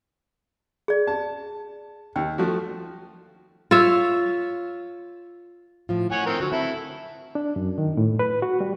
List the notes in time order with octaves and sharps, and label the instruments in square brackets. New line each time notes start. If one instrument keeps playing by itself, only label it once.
[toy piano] G#4 D5
[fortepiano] A5
[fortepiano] D#2 [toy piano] G5
[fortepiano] F3 A3 F#4
[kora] F4 C#5 E5
[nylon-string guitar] A2 F3 F4
[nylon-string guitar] A3 [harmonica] C#5 F#5 G#5
[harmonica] D#3 C4 A#4
[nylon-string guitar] D3 C5 [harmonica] F#3
[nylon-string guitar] C4 [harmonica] E4 A4
[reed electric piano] D4
F#2
D#3
A2
B4
F#4
G3